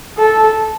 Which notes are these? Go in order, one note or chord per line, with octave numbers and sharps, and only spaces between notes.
A4